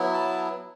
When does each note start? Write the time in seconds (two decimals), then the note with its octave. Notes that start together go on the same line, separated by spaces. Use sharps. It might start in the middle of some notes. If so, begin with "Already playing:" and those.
Already playing: F#3 B3 E4
0.13 A5